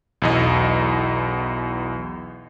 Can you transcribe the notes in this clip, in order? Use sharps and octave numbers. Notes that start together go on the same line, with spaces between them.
B1 E2 D#5